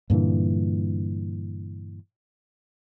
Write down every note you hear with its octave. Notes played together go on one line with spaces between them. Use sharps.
G2 A#2 D3 E3